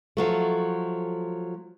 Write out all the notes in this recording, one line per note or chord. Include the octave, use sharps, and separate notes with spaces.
F3 F#3 A3